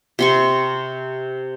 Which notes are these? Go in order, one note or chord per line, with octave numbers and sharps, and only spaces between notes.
C3 C6 C#6